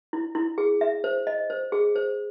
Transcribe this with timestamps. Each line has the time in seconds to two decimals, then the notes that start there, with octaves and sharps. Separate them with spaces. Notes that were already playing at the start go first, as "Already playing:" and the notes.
0.13 E4
0.35 E4
0.58 G#4
0.81 E5
1.04 C5
1.27 D#5
1.50 C5
1.72 G#4
1.96 C5